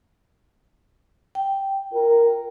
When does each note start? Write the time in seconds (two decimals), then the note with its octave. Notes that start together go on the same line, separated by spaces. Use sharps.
1.35 G5
1.92 F4 A#4